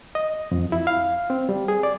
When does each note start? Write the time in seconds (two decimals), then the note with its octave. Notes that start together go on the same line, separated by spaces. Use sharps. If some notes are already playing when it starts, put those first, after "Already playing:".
0.15 D#5
0.51 F2
0.72 E4
0.87 F5
1.30 C4
1.49 G3
1.68 G#4
1.83 D5